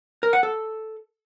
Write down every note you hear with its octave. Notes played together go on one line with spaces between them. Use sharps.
A#4
F#5
A4